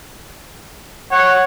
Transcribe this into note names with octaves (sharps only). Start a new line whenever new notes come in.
C#5 F#5